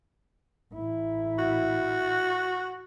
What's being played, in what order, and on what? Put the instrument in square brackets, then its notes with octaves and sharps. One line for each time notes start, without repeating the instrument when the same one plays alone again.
[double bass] A1 E4
[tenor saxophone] F#4